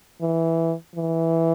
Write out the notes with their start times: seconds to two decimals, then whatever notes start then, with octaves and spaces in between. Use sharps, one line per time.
0.22 E3
0.96 E3